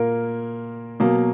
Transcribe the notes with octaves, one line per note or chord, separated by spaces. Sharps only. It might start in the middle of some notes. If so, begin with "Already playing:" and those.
Already playing: A#2 A#3 A#4
B2 F#3 A#3